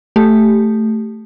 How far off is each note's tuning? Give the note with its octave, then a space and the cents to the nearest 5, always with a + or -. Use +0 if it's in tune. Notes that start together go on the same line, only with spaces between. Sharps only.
A3 +0 G4 +0